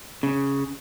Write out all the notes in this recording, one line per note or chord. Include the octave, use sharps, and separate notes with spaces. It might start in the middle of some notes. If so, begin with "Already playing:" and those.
C#3